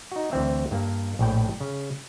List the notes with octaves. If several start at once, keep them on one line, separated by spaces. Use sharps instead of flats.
D#4 F#4
D2 E3 C4 E5
G2 A#3
A#1 A2 G5
C#3